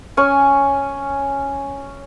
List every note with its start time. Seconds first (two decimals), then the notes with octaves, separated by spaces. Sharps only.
0.17 C#4 G#5 C#6